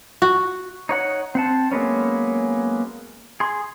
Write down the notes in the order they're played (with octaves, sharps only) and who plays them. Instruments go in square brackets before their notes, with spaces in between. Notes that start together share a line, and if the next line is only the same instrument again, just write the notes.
[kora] F#4
[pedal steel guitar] D#4 C#5 F#5
C4 F#5 A5
F#3 G#3 A#3 B3 C#4
G#4 C6